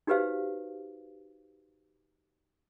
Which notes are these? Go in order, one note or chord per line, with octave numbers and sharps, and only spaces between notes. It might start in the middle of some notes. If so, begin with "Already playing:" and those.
D#4 F#4 G4 B4 C5 F5